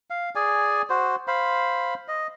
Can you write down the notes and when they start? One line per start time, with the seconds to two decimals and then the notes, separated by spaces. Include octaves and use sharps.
0.10 F5
0.35 G#4 D5 G#5
0.90 F#4 C5
1.28 C5 F5 B5
2.08 D#5